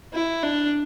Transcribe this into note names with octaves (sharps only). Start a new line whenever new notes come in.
E4
D4